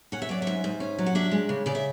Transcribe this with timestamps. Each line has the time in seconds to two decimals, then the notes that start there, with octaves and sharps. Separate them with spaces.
0.12 C#4 F#5
0.22 E5
0.29 F#3 D5
0.42 G#2 E5
0.64 G#2
0.80 C#4
0.98 F#3
1.06 F#5
1.15 D4 E5
1.31 G#3
1.49 C#3
1.66 C#3 D5
1.75 E5